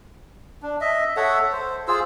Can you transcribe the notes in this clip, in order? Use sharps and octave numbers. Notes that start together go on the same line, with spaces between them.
D4
D#5 E5
A4 C#5 E5 F#5
C5
F4 G#4 C5 E6